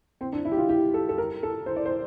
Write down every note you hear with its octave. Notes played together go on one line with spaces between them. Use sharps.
C4
D4
E4
G4
F4
G4
A4
A4
A#4
A4
C5
D5
C5